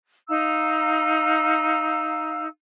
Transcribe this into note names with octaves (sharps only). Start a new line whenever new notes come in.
D#4 F5 A#5 E6